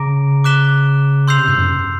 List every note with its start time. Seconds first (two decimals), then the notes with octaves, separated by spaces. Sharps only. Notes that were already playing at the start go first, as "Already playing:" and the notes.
Already playing: C#3 A#5 D6 A#6 D7
0.44 D6 F#6 B6 E7 G7
1.28 C6 E6 G6 C7 F7
1.38 C3
1.48 G2
1.58 F#2